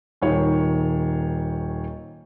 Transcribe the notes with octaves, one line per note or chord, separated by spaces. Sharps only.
D#1 D#3 C#5